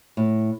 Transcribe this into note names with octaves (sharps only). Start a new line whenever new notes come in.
A2